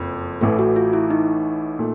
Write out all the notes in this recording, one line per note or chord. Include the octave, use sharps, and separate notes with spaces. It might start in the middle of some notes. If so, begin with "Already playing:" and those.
Already playing: F#1 F2
A1 A2 E3 A3 A4
F#4
F4
E4
D#4
A#2 A3